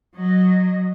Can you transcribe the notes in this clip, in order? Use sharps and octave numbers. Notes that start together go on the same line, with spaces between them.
F#3 D#5